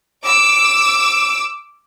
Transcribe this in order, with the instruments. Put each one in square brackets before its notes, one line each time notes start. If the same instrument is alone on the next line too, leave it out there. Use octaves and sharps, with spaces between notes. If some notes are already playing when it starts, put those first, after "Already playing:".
[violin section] D6 E6 D7